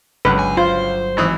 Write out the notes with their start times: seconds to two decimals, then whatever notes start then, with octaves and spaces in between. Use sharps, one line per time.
0.25 G1 C#2 F#3 B4
0.39 G#5
0.57 F4 C5
1.17 G#1 E3 D#6